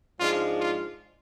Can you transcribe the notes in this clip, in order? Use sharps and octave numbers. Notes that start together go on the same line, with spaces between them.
G#2 F3 G#3 D4 F4
F4